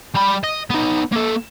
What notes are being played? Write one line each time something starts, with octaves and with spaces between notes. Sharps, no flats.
G3 B5
D#5
B3 D#4
A#3 A4